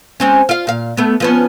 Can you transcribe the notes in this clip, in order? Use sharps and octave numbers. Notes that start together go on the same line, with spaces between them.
G#3 C4 C#4
F4 F5
A#2 F5
A3 B3
F3 B3 C#4